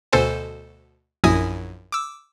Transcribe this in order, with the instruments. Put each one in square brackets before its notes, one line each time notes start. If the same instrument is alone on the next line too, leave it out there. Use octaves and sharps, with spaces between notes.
[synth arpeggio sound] D2 B2 A4 C5 G#5
A#1 F#2 E4 G#5 D#6 A#6
D6 E6